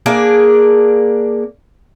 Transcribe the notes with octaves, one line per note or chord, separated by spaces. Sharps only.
A#3 D4 G#4